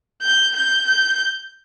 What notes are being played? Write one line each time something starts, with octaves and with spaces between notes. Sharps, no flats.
G6
G6
G6